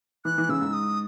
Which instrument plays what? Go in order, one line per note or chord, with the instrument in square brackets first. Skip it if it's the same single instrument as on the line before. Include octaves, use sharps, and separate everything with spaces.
[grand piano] E3 [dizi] F#6
[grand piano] E3
[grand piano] C#3 [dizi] E6
[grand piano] G#2
[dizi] D#6